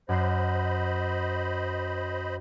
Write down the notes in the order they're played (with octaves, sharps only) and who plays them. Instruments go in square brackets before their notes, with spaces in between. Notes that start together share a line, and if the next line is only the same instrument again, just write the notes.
[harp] F#2 C7 [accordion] C5 D#5 B5